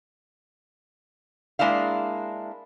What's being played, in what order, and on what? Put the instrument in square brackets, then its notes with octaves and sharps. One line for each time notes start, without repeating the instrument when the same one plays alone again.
[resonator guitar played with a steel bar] G#3 A#3 D4 E4 F5